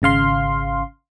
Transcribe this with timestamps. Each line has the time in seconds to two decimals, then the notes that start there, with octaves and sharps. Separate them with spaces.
0.02 G#1 C#3 F5 C6